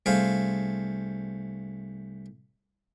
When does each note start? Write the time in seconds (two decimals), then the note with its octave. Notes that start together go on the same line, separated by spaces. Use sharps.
0.06 C2 A3 G#4 C5 F5